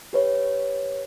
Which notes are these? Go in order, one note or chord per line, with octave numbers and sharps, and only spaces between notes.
G4 B4 C#5